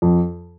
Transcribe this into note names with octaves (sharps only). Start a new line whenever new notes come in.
F2